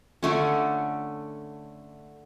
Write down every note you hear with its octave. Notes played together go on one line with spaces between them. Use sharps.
D3 A3 C#4